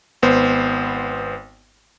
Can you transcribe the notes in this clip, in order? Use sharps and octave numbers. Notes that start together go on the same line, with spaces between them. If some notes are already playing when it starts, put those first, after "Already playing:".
G#1 B3 C5